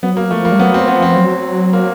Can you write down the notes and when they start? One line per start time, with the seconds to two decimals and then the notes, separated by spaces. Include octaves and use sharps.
0.03 F#3 B3
0.17 A#3
0.31 F3 A3
0.45 A#3
0.52 G3
0.59 F#3 B3
0.74 C4
0.88 F3 B3
1.02 C4
1.16 F#3
1.73 A#3